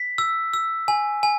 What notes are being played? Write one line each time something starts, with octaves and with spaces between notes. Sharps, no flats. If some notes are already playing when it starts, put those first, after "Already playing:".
Already playing: B6
E6
E6
G#5
G#5